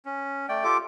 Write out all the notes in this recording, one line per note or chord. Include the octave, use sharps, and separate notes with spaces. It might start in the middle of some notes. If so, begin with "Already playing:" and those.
C#4
A3 D5 G5
F4 G4 A4 D6